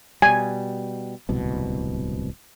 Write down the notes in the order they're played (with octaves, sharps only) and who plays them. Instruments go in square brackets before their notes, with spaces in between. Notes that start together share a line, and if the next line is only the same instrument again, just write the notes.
[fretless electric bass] B2 G3 [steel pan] G#5
[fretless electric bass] D1 C2 B2